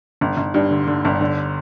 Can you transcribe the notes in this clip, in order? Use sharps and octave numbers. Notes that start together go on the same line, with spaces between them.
G1
G1
G2
D3
D3
G1
D3